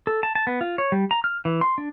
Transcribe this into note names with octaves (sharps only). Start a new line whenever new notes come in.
A4
A5
A5
B3
F4
C#5
G3
A#5
F6
E3
C6
D4